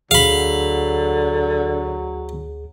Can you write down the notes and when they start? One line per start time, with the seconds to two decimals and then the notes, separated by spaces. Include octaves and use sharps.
0.11 D2 D3 F#3 G#4 F5 B5